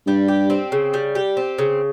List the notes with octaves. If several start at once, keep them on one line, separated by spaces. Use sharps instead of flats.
G2 G3
G4
C4
C#3
G3
G4
C4
C#3